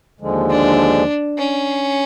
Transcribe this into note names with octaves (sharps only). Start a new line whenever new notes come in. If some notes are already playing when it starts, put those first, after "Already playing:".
D#2 D3 F3 G#3
D4
C#4